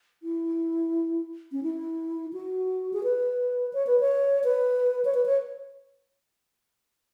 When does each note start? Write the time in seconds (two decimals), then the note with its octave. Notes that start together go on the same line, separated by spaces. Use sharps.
0.23 E4
1.52 C#4
1.63 E4
2.33 F#4
2.93 G#4
3.04 B4
3.73 C#5
3.87 B4
4.00 C#5
4.44 B4
5.05 C#5
5.14 B4
5.26 C#5